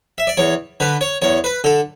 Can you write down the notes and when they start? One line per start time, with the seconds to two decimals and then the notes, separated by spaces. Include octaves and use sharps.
0.18 E5
0.27 D5
0.37 E2 C#5
0.80 D3 B4
1.01 C#5
1.22 E2 C#5
1.44 B4
1.64 D3 A4